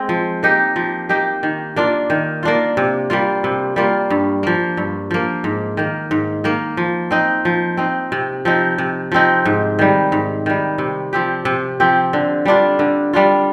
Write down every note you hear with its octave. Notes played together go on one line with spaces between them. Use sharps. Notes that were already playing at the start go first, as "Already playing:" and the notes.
Already playing: G#3 C4
F3
A#3 D#4 G4
F3
A#3 D#4 G4
D#3
A#3 D4 F4
D#3
A#3 D4 F4
C3
G3 A#3 F4
C3
G3 A#3 F4
G2
F3 A#3
G2
F3 A#3
G#2
D#3 A#3
G#2
D#3 A#3
F3
C4 D#4
F3
C4 D#4
C3
F3 C4 D#4
C3
F3 C4 D#4
G#2
D#3 G3
G#2
D#3 G3
C3
F3 C4 G4
C3
F3 C4 G4
D3
G3 D4 F4
D3
G3 D4 F4